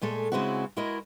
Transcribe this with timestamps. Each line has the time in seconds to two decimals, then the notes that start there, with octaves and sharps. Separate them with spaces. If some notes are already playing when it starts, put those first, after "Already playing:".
0.01 A#2 G#3 A3 A4
0.32 C#3 G#3 C4 E4 F#4
0.76 G#3 E4 F#4 A#4 D#5